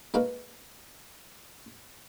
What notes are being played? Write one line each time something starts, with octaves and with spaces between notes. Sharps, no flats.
G#3 A#3 D#4 F#4 A#4 B4